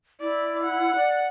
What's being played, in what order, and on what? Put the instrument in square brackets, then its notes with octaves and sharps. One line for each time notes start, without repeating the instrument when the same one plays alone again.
[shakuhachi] E4 [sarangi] D5
[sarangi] F#5
[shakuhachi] D5